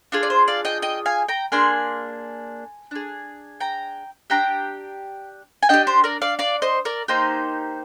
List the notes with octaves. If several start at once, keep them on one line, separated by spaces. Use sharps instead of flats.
D4 F4 G#4
D5
C5
D5 F5
D#5 G5
D#5 G5
F5 G#5
G5 A#5
A#3 D4 G#4 G#5 C6
D4 G#4
G5 A#5
D4 G4 G5 A#5
G#5
D4 G4 D#5 G5
C5
A#4 D5
D5 F5
D5 F5
C5 D#5
A#4 D5
A#3 D#4 G4 C5